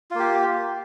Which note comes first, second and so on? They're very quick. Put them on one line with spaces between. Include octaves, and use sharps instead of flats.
F4 A#3 G4